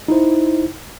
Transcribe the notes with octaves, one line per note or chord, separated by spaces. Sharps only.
D#4 E4 C5